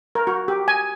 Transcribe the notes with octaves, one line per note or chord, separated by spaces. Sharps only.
A#4
F#4
G4
G#5